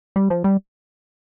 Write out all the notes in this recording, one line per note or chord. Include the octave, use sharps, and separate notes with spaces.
G3
F3
G3